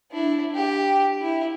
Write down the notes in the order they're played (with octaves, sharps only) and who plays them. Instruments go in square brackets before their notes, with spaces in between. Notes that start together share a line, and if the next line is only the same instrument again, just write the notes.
[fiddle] D4 E4
G4
E4